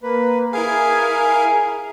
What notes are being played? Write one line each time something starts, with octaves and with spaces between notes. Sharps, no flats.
A#3 B4
E4 G#4 A#4 F5 G#5